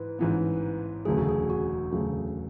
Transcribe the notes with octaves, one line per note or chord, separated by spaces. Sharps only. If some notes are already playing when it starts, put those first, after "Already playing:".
Already playing: G#2 E3 B4
A1 G#2 E3 B3
E1 D2 C#3 F#3 A3 G#4
F#4
G#4
F#4
E1 D2 C#3 F#3 A3 G#4